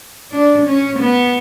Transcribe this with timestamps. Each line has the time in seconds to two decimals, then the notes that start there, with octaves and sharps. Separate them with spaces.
0.32 D4
0.66 C#4
0.99 B3